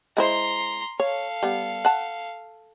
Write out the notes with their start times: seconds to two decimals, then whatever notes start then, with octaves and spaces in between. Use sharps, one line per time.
0.17 G#3 E4 C5 A#5 C6
1.00 A4 C#5 F5
1.43 G3 B3
1.85 F#5 A5